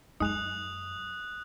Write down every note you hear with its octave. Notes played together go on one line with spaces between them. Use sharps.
F#2 G#3 D#4 D#6 F#6 F7